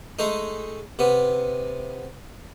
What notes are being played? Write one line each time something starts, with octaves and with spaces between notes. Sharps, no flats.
G#3 A3 D#4
C3 B3